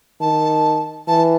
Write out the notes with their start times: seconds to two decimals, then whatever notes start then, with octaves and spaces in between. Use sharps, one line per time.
0.21 D#3 A5
1.08 E3 A5